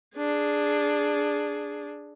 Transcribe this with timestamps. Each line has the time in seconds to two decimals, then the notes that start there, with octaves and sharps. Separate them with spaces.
0.17 D4 G#4